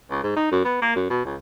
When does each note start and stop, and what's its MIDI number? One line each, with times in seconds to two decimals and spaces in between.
0.11 0.23 37
0.24 0.31 44
0.36 0.50 63
0.52 0.63 42
0.64 0.77 59
0.82 0.94 58
0.95 1.08 42
1.10 1.23 47
1.25 1.36 37